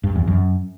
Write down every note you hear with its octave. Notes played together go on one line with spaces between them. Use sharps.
G2
E2
F#2